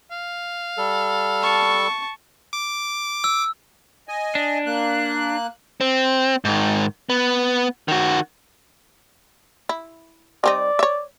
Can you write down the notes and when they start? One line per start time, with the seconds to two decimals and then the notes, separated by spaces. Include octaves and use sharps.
0.11 F5
0.78 G3 A4
1.42 A5 C#6
2.53 D6
3.24 E6
4.08 D#5 G#5
4.35 D4
4.66 A#3 F#6
5.81 C4
6.45 G#2 D#3
7.10 B3
7.88 D#3 F#4
9.69 E4
10.44 G3 C4 D#4 D5
10.79 C#5 E5